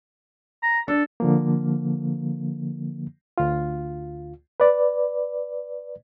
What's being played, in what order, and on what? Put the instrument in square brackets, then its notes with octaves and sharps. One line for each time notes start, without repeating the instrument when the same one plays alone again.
[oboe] A#5
[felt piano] D4 [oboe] A4
[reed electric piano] D3 F3 A#3
D2 F4
B4 D5